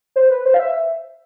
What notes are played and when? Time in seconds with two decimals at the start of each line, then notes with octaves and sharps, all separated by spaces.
0.16 C5
0.30 B4
0.45 C5
0.54 F5
0.59 E5